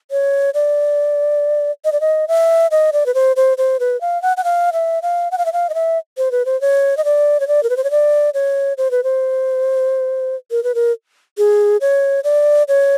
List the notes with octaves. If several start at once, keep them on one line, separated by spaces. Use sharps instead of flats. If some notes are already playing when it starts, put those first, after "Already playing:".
C#5
D5
D#5
D5
D#5
E5
D#5
D5
B4
C5
C5
C5
B4
F5
F#5
F#5
F5
E5
F5
F#5
F5
E5
F5
D#5
E5
C5
B4
C5
C#5
D#5
D5
C#5
D5
A#4
B4
C5
C#5
D5
C#5
C5
B4
C5
A#4
B4
A#4
G#4
C#5
D5
C#5